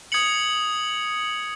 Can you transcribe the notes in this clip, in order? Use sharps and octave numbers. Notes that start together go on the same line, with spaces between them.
D#6 G#6 C#7 F#7